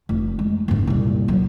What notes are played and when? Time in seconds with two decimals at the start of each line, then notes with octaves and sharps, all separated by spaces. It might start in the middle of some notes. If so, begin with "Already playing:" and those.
0.09 F1
0.39 G#3
0.68 F#1 G#2
0.87 C2 A#2
1.28 F#3